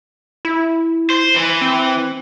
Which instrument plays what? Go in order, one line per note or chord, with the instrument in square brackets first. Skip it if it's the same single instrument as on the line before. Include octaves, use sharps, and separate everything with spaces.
[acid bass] E4
[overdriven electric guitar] C5
E3
[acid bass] C4